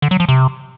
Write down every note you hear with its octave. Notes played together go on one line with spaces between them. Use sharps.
D3
F#3
F3
C3